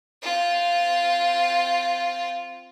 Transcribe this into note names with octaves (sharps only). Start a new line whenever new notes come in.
C4 F4